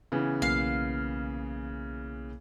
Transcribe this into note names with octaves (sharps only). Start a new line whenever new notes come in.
C#3 E3 B3
B1 A#3 F5